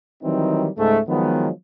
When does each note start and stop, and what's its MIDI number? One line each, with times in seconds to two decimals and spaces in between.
0.23 0.68 51
0.23 0.68 52
0.23 0.68 54
0.23 0.68 55
0.23 0.68 60
0.23 0.68 63
0.77 1.00 37
0.77 1.00 44
0.77 1.00 56
0.77 1.00 57
1.09 1.50 51
1.09 1.50 53
1.09 1.50 54
1.09 1.50 56
1.09 1.50 59